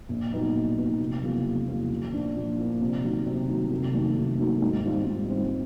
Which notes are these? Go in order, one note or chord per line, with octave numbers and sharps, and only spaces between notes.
A#1
A#2 F#3 B3 D#4
A#1
A#2 F#3 B3 D#4
F1
E2 C#3 F#3 A#3
F1
E2 C#3 F#3 A#3
A#2
F3 A#3 D4
A#2
F3 A#3 D4
C3
D#3 F#3
C3
D#3 F#3
F1
D#2 D#3 F#3 A3
F1
D#2 D#3 F#3 A3
G#2
D#3 G3 C4 F4
G#2
D#3 G3 C4 F4